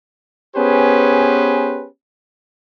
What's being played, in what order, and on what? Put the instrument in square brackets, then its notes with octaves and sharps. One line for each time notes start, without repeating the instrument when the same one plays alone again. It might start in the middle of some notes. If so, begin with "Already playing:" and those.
[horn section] B3 C#4 G4 G#4 B4 C5